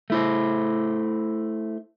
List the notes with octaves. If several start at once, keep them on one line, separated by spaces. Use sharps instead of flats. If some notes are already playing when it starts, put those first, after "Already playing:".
A3 E4 C5